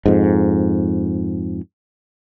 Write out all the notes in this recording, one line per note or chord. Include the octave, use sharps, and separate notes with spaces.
F2 G#2